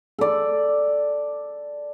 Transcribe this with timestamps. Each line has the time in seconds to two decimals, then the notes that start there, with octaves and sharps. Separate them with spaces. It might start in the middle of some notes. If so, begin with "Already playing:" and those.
0.19 A4 D5